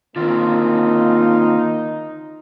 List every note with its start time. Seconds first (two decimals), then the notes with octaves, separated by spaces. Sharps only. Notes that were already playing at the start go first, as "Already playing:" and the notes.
0.16 D3 D#3 A#3 C4 D#4 F4